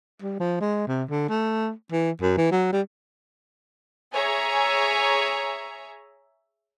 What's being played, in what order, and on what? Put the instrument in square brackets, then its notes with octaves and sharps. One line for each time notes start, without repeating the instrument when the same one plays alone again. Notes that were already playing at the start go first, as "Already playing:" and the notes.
[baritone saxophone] G3
F3
G#3
C3
D3
A3
E3
F#2
E3
F#3
G3
[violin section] G#4 C#5 E5 G#5 A#5